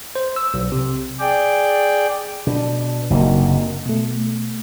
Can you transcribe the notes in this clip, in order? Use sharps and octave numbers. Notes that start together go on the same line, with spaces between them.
C5
E6
B1
C3
G#4 D5 G5
B2 D4
F#1 C3 A#3 D#4 F#4
B2 A3